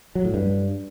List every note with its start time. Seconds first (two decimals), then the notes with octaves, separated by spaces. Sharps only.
0.15 F#3
0.25 A2
0.34 G2